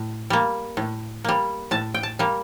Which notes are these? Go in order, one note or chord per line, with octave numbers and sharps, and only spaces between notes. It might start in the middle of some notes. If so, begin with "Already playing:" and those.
Already playing: A2
G3 A#3
A2
G3 A#3
A2 A5
G5
A5
G3 A#3